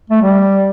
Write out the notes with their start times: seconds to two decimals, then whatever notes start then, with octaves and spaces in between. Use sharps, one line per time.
0.10 A3
0.22 G3